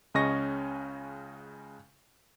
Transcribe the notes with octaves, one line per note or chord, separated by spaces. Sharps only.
C#2 C#3 C#4 D#5 C#6 A#6